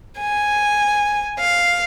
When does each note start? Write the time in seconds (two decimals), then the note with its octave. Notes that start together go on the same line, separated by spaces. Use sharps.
0.19 G#5
1.40 F5